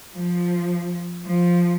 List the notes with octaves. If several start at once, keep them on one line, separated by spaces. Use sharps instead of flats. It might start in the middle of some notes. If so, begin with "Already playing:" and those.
F3
F3